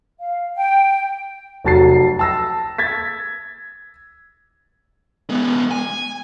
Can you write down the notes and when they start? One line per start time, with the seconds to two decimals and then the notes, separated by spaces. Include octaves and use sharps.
0.19 F5
0.56 G5
1.64 F1 F#3 A5 A6 C7
2.19 A5 E6 A#6
2.78 G#6 A6 B6
5.29 G#3 B3
5.71 G#5